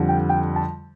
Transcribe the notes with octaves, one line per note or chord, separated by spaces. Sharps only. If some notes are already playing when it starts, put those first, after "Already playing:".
Already playing: F2 D3 G3
G5
G5
A5